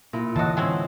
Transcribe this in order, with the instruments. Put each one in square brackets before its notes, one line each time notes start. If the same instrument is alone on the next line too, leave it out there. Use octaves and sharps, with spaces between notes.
[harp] A#2 E4
[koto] A2 F#4 [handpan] D3 E3 [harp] D#5 A5
[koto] G#3 C4 C#4